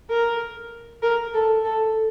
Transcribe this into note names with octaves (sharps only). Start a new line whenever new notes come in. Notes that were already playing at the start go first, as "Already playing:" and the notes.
A#4
A#4
A4
A4